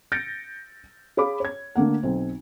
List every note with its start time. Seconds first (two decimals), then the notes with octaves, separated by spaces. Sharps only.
0.12 G6 A6 A#6 C#7 D7
1.17 G#4 C#5 F5 B5 D6
1.40 C#5 G#6
1.76 D3 A3 A#3 F#5
2.03 B1 C4